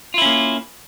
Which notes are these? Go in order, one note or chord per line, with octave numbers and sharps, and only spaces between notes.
A#3 C#4 E4 F4